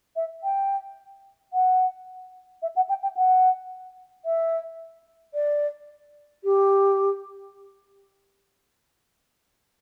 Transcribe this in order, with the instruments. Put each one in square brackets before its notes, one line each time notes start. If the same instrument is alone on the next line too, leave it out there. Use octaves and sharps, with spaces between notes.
[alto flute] E5
G5
F#5
E5
F#5
G5
G5
F#5
E5
D5
G4